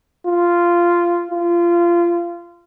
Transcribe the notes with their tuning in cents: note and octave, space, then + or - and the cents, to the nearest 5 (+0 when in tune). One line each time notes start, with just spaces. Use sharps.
F4 -10
F4 -25